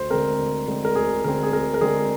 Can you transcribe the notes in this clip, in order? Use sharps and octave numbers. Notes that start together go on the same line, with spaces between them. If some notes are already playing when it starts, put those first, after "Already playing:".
Already playing: D2 C5
D3 G#3 C4 A#4
D2
D3 G#3 C4
A#4
D2 G#4
D3 G#3 C4 A#4
G#4
D2 A#4
A#4
D3 G#3 C4 G#4